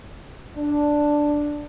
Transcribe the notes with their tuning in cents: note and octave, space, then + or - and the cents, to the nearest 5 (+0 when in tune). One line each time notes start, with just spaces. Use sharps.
D4 +0